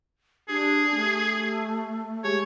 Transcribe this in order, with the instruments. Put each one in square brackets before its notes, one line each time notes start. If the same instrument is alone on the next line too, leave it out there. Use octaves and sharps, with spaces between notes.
[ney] D4 [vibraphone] G4 [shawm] G#4
[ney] A3
[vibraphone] G#3 G4 G#4 [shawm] C#5